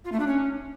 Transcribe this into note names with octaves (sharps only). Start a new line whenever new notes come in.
F4
A3
D4
C#4